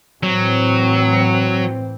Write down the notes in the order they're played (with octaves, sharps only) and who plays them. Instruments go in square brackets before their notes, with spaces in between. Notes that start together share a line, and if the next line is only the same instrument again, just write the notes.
[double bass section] A2 E3 C4 [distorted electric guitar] F#3